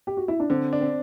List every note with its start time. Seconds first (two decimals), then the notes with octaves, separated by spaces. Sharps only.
0.07 G4
0.17 F#4
0.28 E4
0.40 D4
0.50 D3 C4
0.73 D4
0.81 C4